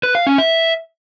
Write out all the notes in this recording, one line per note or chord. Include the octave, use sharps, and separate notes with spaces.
B4
F5
C#4
E5